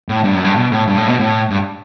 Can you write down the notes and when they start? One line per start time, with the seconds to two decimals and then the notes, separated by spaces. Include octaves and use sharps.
0.09 A2
0.24 G2
0.34 F#2
0.44 G2
0.56 B2
0.72 A2
0.87 G2
0.98 A2
1.08 B2
1.19 A2
1.50 G2